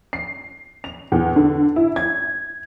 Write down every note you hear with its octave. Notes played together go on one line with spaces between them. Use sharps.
C7
F7
E2
D3
E4
G#6